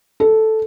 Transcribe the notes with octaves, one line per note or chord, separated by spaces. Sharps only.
A4